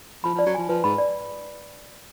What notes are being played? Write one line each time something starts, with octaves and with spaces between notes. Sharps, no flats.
F3 B5
F3
D5
F#3
F3 G#5
F3 B4
G#2 B5
D5